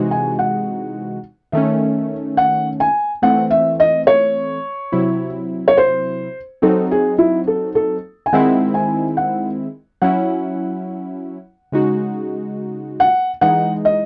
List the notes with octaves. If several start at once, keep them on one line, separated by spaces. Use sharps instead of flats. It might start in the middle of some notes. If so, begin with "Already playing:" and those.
Already playing: C3 E3 G#3 D#4 F#4
G#5
F#5
D#3 A3 C#4 E5
F#5
G#5
E3 A3 C4 F#5
E5
D#5
C#5
C3 F#3 C4 E4
C#5
C5
F#3 C4 D#4 F#4 A4
G#4
E4
A4
A4
G#5
D#3 G#3 C4 E4 F#5
G#5
F#5
F#3 C#4 E4 F#5
C#3 G#3 D#4 F#4
F#5
E3 G#3 D#4 F#5
D#5